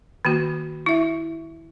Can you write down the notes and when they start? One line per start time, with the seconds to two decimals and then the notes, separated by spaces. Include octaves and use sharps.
0.25 D#3 A#3 F#4
0.86 E4 E5